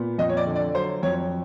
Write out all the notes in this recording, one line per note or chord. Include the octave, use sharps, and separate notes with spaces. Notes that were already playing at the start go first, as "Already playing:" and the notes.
Already playing: A#2 B3
F2 D#5
C#5
D5
D3
D5
F#3 C5
F2 C#5